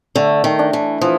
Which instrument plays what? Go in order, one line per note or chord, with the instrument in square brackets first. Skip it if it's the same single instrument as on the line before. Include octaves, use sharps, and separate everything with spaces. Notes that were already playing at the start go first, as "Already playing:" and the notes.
[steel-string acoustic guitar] D3 [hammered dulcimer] A3
[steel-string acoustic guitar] D#3
[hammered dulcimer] D4
[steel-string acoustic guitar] E3
[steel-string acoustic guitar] E3 [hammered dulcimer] F3